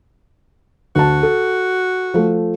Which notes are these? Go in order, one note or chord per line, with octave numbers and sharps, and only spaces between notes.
D2 F#4 A5
A4
F3 A3